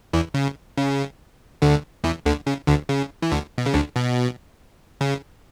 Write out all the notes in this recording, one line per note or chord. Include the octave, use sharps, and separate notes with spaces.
E2 E3
C#3
C#3
D2 D3
E2 E3
D2 D3
C#3
D2 D3
C#3
E3
D2 D3
B2
C#3
D2 D3
B2
C#3